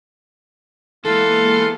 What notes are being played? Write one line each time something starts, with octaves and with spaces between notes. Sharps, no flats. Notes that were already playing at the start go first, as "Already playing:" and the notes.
E3 G#3 A#3 B3 F4 A4